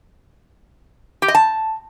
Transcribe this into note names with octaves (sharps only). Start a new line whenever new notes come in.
G4
D#5
A5